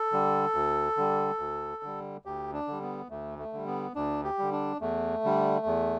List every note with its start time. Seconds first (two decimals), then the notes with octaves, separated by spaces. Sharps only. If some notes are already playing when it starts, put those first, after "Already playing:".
Already playing: A4
0.12 D3 G3
0.55 D2
0.97 D3 G3
1.39 D2
1.83 D3 G3
2.25 D2 G4
2.53 D4
2.67 D3 G3
2.82 B3
3.10 D2 A3
3.39 A3
3.53 D3 G3
3.67 B3
3.95 D2 D4
4.24 G4
4.38 D3 G3
4.52 D4
4.81 E2 A3
5.24 D3 G3
5.66 E2